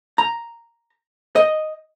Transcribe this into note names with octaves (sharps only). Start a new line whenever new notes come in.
A#5
D#5